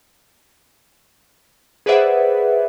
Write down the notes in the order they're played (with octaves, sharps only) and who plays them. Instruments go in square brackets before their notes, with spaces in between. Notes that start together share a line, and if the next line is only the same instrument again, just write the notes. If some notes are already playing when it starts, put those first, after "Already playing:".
[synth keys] G#4 B4 C5 D5 E5 F#5